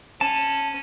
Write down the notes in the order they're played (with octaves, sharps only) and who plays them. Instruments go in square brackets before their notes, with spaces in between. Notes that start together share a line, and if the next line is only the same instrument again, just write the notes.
[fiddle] C#4 [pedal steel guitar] A5